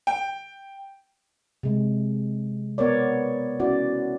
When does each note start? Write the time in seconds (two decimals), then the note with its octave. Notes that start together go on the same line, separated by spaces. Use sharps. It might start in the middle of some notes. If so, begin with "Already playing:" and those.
0.07 G5
1.63 C3 G#3
2.78 B3 A#4 C#5 D5
3.60 C#4 E4 F#4 D5